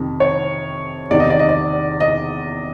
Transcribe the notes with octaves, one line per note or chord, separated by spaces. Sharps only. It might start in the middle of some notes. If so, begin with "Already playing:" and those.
Already playing: F2 C3 D#3
C#5
E2 C3 D#3 D5
D#5
D5
D#5
D5
D#5